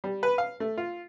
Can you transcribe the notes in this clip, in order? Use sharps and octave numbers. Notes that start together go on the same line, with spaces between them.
G3
B4
F5
A3
F4